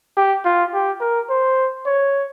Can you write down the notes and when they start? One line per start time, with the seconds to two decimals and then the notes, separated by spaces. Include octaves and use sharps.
0.17 G4
0.45 F4
0.73 G4
1.01 A#4
1.30 C5
1.86 C#5